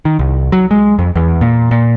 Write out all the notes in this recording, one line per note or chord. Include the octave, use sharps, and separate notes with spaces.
D#3
C2
F#3
G#3
F2
E2
A#2
A#2